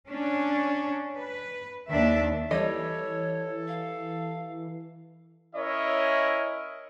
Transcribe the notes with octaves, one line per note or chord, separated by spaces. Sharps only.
C#4 D4
B4
D#2 D#3 D4 E5
E3 G3 A4 C#5 D#5
F5
C#4 E4 A#4 C#5 D#5 E5